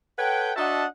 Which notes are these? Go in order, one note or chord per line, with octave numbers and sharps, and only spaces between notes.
A4 B4 C#5 F#5 G5
D4 F#4 D#5 E5 F#5 A5